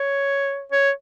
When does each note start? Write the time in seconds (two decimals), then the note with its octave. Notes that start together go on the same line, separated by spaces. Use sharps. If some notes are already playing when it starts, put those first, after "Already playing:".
Already playing: C#5
0.72 C#5